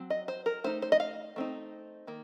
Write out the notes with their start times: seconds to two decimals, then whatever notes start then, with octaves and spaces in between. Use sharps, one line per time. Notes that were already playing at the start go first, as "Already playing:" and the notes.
Already playing: F#3 C4
0.10 D#5
0.28 C5
0.46 A#4
0.64 A3 D#4 C5
0.82 C5
0.92 D#5
1.00 F5
1.36 A3 C4 D#4
2.07 D#3 A#3